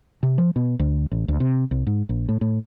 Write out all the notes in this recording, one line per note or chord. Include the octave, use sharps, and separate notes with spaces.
C3
F3
B2
D2
A1
D2
C3
C2
G#2
A#1
A2
A2